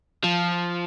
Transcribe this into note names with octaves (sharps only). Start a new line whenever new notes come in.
F3